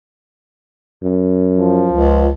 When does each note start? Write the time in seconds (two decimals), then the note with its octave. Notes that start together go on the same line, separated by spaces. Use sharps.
1.03 F#2
1.58 F3
1.92 C#2